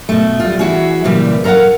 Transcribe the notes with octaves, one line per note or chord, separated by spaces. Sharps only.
B2 A3
G3 F4
E3 E4 F#4 G#4
A#2 C#3 E3 G3
A4 A#4 C5 F5 F#5